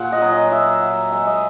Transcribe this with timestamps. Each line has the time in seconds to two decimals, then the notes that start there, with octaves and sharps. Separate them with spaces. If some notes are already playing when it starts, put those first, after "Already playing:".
Already playing: A#2 F#4 G#4 F#5
0.12 D#5
0.22 F#3
0.32 D#5
0.52 F#3 E5
0.82 F#3
1.12 G#3 E5
1.27 D#5